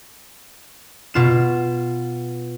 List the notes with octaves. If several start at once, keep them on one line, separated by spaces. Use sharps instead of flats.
B2 F4 E7